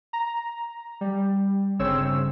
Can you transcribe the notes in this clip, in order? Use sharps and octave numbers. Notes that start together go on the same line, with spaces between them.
A#5
G3
G1 C#3 C4 C#5 E6